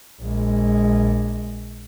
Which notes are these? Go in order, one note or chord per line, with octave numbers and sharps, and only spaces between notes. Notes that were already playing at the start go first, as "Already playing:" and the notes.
A#1 G#3